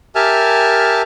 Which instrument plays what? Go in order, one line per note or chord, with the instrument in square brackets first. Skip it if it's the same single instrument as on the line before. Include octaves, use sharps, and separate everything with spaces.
[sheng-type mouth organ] G4 A#4 E5 G#5 A5 F6